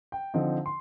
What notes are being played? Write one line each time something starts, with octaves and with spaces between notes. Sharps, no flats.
G5
D3 F3 C4 D#4
C6